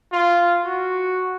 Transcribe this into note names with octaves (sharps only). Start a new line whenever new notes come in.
F4
F#4